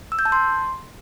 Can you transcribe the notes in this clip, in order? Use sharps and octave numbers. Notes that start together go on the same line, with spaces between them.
E6
G6
A5
C6